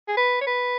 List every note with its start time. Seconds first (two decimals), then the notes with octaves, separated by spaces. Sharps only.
0.08 G#4
0.17 B4
0.41 C#5
0.47 B4